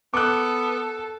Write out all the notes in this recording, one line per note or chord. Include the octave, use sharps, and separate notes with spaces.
B3 A4 D6 F#6